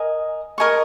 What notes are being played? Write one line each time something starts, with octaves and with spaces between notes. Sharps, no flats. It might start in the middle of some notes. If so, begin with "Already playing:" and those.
Already playing: A#4 D#5 G#5
A#4 D#5 G#5 C#6